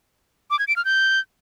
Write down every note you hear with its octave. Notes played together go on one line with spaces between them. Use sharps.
D6
G#6
D7
F6
G6